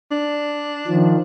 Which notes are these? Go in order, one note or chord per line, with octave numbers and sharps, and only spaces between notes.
D4
D#3 F3